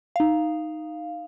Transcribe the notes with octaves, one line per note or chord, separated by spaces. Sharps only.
D#4 F5